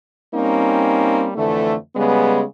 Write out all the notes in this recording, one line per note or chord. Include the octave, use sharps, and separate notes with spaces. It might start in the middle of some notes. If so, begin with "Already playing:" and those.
G3 A#3 C4 C#4 D#4
F2 D3 E3 A3
C#3 G3 G#3 B3